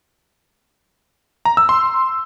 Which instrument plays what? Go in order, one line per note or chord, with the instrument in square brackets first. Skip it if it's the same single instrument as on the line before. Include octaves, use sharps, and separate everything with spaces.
[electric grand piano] A#5
E6
C6